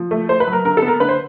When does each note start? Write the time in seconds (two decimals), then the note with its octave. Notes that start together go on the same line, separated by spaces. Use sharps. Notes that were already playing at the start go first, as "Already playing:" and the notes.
Already playing: F3
0.11 A3
0.29 A3 C5
0.40 B4
0.47 F#3
0.53 A#4
0.65 D3 A#4
0.77 A4
0.82 B3
0.88 A#4
1.00 D3 B4
1.09 C5